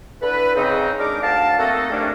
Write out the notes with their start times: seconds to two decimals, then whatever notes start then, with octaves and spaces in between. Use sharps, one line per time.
0.21 D3 E3 A4 B4
0.56 C#3 C4 D#4
0.99 G#3 D4 D#4 A#4 D6
1.22 D2 F5 A5
1.58 A3 A#3 C4 D#4 F#4 A4
1.91 C3 D#3 A3 A#3 C#4 D4